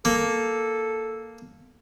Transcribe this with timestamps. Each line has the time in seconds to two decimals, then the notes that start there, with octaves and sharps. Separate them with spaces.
0.05 A#3 A4